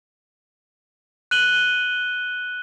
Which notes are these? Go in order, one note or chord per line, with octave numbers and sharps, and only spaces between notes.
F#6 D#7 F#7 G7